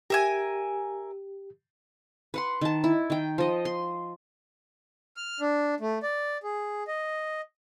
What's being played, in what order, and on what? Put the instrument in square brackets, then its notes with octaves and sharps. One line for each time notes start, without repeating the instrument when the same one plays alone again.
[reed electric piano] G4 [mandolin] A#4 E5 G#5
[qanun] B4 F#5 C6
D#3 A5
E4
D#3 G5
F3 D#5
C6
[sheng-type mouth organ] F6
D4
A3
D5
G#4
D#5